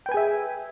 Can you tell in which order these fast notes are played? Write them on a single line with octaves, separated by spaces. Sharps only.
G5 B4 G#5 G#4 E5